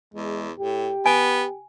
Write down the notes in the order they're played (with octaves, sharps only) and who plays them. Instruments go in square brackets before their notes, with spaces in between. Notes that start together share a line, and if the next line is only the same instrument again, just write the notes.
[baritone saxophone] E2 [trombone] G#3
[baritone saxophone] A2 [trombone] G4
[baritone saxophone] B3 [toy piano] G#5